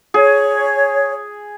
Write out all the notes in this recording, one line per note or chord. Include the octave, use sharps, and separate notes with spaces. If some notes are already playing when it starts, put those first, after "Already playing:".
G#4 C#5